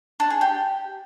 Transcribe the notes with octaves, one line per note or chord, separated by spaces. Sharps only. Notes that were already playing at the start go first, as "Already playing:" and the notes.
D4
G#4
G4